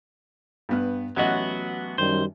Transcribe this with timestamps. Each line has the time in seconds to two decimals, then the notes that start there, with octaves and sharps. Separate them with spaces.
0.69 G2 B3 F#6
1.16 A1 F#3 B3 F#4 D#5
1.98 F#2 D#3 G3 C5